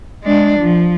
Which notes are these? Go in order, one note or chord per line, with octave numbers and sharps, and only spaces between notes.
G#3 D4
F3